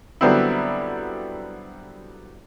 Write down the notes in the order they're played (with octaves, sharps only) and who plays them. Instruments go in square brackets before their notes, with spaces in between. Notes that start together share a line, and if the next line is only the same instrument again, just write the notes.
[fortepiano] D3 F#3 G3 B3 C4 E4